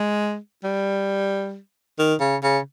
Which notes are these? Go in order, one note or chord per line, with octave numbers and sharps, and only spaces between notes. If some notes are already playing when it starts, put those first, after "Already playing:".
Already playing: G#3
G3
D#3
C#3
C#3